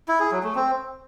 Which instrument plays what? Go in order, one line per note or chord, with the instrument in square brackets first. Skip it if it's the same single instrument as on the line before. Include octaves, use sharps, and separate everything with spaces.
[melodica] E4
G#4
F#3
A3
C4